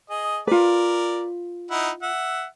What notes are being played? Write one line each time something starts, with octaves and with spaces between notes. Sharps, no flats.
G#4 D#5
F4 A#4 B4 D5
D#4 E4 F#5
E5 F#5